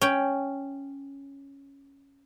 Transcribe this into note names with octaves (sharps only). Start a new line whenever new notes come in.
C#4 G5